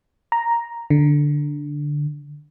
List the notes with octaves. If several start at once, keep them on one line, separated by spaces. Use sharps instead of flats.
A#5
D3